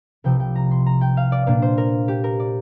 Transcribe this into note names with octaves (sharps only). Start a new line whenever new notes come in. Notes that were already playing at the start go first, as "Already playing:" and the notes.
C2 C3 F3 G5
G5
A#5
C6
A#5
G5
F5
D5
A#2 A#3 D4 D5
C5
A#4
G4
A#4
D5